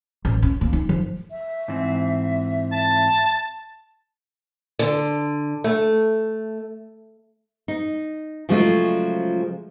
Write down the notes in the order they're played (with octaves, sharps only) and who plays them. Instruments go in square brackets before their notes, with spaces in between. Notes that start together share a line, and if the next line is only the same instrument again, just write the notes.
[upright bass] A1
C#4
A#3
D#4
F3
[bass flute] E5
[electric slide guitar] G#2 E3 C4
[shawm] A5
[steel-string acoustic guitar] D3
A3
[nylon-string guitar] D#4
C#3 F3 F#3 G#3 A3 F4